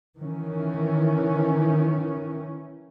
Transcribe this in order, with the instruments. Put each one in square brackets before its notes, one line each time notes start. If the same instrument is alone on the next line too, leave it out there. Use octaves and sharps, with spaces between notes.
[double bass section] D#3 E3 C#4